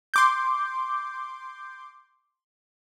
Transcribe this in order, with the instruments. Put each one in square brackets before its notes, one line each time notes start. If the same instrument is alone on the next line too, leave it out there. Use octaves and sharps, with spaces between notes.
[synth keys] C6 D6 G6